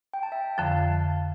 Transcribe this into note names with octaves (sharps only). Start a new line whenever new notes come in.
G5
A5
E5 G5
F2 D3 F3 F5 A5